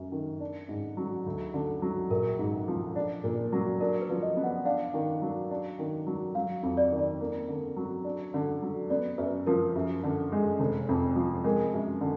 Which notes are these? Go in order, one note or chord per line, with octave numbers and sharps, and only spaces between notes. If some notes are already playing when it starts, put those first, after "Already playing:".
Already playing: F#2
D#3
D4
G#2
F#3
D2
D3
F#3
A#1 A#4
G#2
F3
D4
A#2
F#3
D4 A#4
B4
F3
D#5
B3
F#5
D4 F5
D#3
F#3
D4
D#3
F#3
F#3 F5
F2
D5
D#3
D5
A#3
D3
F#3
D4
D3
F#3
B3 D5
F#2 B4
F3 A#4
F#2
D3
G#3
F1
F2
F3
G#3 A#4
F#2
D3